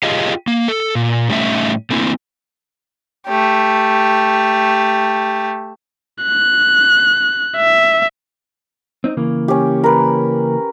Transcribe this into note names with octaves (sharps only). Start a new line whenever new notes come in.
F4 G4 G#4 D#5 F5
A#3
A4
A#2
A2 G3 A3 C#4 D#4 E5
A3 A#3 C4 E4
A3 G4
F#6
E5
C4 D#4
C#3 E3 A#3
C#4 G4
A#4 B4